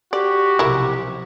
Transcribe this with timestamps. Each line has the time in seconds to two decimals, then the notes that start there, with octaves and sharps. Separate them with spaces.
0.13 F#4 G4 D5
0.59 B1 C3 F3 E4 A#4